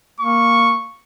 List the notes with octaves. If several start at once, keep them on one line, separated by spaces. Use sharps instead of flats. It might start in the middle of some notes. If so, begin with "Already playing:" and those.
A#3 C#6